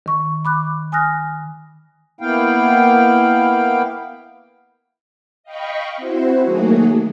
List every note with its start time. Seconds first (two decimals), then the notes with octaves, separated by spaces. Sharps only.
0.06 D#3 C#6
0.45 B5 D6 F#6
0.92 G#5 D#6 F6 F#6 A#6
2.21 A#3 B3 E4 F5 G5
5.44 D#5 F5 G5 B5 C#6
5.97 C4 E4 F#4 C5
6.41 D#3 F#3 A3 A#3 F#4 G#4